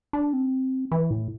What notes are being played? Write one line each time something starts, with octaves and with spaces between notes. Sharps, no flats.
D4
C4
E3
A2